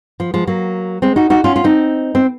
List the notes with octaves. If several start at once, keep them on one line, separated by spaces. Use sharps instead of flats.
F3
F3 G#3
F#3 A#3
G#3 C4
D#4 F#4
D#4 F#4
C#4 F4
F4
C4 D#4
C4